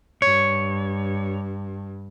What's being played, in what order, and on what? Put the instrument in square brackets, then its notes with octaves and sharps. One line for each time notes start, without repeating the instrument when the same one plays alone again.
[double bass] G2 [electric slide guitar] C#5